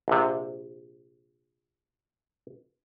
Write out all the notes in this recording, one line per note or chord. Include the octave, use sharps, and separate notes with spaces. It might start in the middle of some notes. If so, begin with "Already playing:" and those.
A#1 C3